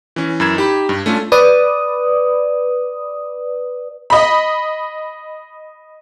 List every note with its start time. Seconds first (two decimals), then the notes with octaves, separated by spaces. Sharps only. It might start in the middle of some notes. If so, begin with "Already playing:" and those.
0.16 E3 C#4
0.40 F#2 E3 B5 G#6 E7
0.56 D#4 G4 B5
0.89 G2
1.06 A3 C#4 D4 F4
1.32 B4 D5 D#6
4.10 D#5 B5